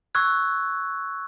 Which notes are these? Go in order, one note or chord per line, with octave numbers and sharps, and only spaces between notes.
C#6 E6 F#6 G#6